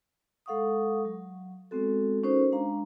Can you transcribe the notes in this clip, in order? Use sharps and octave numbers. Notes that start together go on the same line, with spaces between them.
G#3 A4 F5 F#5 C#6 D#6
F#3
G#3 B3 C4 F#4 A4
C#4 D#4 F#4 A4 A#4 C5
G#3 D4 F5 A#5